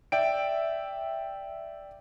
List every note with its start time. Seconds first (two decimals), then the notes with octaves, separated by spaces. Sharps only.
0.12 D5 E5 G5 D7